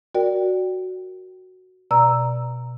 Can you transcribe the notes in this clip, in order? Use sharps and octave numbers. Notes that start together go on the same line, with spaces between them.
F#4 A#4 D5 G5
B2 D5 A#5 E6